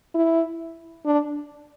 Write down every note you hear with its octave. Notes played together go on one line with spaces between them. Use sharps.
E4
D4